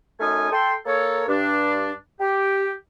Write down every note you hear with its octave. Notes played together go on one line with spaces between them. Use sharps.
F#2 A3 D#4 G#5 D#6 F6
A4 G5 C6
A#3 A4 C#5
G2 D4
G4